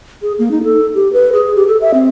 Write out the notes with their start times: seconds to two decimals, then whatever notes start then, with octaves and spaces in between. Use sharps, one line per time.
0.22 G#4
0.39 A#3
0.51 D#4
0.64 A4
0.94 G4
1.13 B4
1.33 G#4
1.56 G4
1.67 A4
1.81 E5
1.94 C4